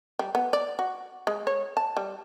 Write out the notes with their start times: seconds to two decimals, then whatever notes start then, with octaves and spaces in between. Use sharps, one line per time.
0.19 G3
0.35 B3
0.53 D5
0.79 F#4
1.27 G#3
1.47 C#5
1.77 A5
1.97 G3